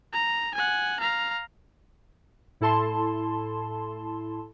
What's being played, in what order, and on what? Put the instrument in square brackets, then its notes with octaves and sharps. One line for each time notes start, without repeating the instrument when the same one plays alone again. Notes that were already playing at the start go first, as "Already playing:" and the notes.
[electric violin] A#5
F#5 G#5
F5 A#5
[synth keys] A2 E4 A4 A5 C6